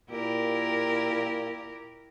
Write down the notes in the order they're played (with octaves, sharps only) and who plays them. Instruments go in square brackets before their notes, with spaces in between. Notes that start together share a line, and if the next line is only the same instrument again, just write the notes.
[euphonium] A#2 [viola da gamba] E4 G4 A#4